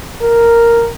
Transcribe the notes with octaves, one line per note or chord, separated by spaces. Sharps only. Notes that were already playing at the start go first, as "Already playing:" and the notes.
A#4